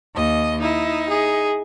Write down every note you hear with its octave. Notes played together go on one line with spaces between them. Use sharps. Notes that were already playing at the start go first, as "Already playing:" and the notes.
D#2 D#5
D#4 E4
G#4